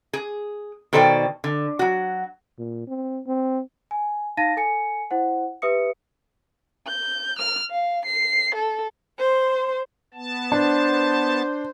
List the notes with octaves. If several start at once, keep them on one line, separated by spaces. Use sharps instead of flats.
G#4
B2 D#3 A4 C5 D5 G5
D3
F#3 F#4
A#2
C4
C4
G#5
D#4 F5 A5 A6 A#6 D#7
A4 G#5 C#7
E4 C5 F#5
G4 B4 E5 D#6 C#7
G6
F6
F5
C7
A4
C5 C6
B3 A5
D4 C5